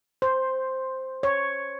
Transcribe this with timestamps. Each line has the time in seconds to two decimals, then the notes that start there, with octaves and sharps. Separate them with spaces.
0.22 C5
1.23 C#5